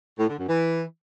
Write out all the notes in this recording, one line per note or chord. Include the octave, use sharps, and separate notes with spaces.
A2
D3
F#2
E3